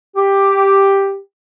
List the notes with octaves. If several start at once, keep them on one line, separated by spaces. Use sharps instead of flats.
G4